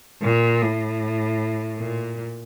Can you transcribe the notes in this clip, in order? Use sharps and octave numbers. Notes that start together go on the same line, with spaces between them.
A#2
A2
A#2